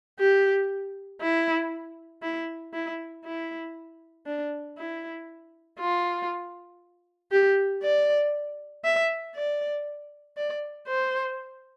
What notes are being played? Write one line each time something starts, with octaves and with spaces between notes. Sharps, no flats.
G4
E4
E4
E4
E4
D4
E4
F4
G4
D5
E5
D5
D5
C5